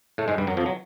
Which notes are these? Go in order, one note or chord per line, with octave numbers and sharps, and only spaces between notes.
A2 A3
G#2 G#3
G2 G3
F#2 F#3
F2 F3
F#3